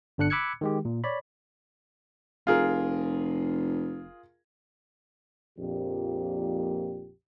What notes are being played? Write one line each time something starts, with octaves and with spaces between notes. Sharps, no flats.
G1 D3 D4 F#6 C#7
B5 D6 E6 F#6 G#6 C#7
D#3 G#3 G4
A#2
C#5 D5 B5
F1 F4 G#4 A#4
A#1 F2 A#2 G4